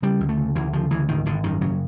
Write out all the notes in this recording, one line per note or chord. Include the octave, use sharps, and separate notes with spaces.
C#3 G3
D2
A3
C#3
D2 E3
C#3 F3
D2 E3
G#1 D#3
G#1 D3
F#2 D#3
C#3 F#3